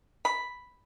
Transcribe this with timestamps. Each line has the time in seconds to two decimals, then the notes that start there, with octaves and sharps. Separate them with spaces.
0.25 B5